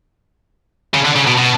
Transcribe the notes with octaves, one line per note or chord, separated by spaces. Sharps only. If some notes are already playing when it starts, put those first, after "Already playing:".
C#3
D3
C#3
B2
B2